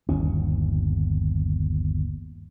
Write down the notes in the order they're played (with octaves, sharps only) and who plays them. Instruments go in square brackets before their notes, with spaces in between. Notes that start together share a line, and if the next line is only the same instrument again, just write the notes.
[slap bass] G1 D#2 C#4